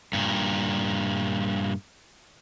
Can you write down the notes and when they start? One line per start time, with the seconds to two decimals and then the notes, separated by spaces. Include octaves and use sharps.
0.13 G2 A#2